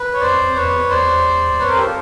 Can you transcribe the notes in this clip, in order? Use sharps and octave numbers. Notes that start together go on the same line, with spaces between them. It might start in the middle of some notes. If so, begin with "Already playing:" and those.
Already playing: B4
C#5
F2 C5 D5
F2
E2 B4 C#5
F2
E2
F2
E2 C5 D5
E2
F2 B4 C#5
A#4 C5
G4 A4
F4